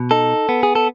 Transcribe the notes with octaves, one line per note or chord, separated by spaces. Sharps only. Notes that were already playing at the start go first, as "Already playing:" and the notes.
Already playing: B2
D#4 A4
B3
G#4
A4